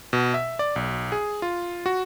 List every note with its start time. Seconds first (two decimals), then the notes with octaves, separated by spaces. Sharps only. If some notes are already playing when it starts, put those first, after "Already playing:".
0.13 B2
0.34 E5
0.59 D5
0.76 B1
1.12 G#4
1.42 F4
1.86 F#4